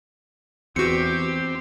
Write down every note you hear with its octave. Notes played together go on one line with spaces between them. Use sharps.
E2 C4 F#4 G4 C#7